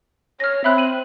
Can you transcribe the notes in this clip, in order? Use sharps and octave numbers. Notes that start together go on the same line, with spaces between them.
C#5 F6 A#6
C4 E5 B5 F#6
D#7 F#7